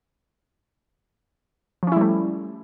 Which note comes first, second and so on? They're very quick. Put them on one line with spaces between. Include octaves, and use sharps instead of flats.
F3 C#4 E4 G3 A3